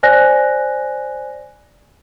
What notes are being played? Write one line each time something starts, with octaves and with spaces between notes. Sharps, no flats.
C5 D5 G#5 F#6 A#6